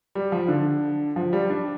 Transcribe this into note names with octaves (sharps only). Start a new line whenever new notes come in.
G3
F3
D3
F3
G3
D4